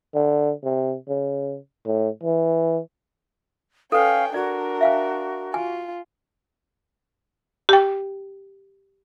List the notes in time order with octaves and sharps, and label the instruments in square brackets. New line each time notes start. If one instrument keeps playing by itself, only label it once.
[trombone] D3
C3
C#3
A2
E3
[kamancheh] C#4 G5 [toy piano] A4 B4 [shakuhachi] F5
[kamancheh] D4 A#4 [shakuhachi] F#4 [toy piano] D5
[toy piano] E5 F5 G#5
[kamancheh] F4 [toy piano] G#5
[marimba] G4 G5